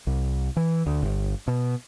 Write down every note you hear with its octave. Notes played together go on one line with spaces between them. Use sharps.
C2
E3
D2
G1
B2